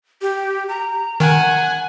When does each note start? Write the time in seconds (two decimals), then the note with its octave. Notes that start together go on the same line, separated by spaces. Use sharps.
0.22 G4
0.69 A#5
1.20 D#3 F#5 G#5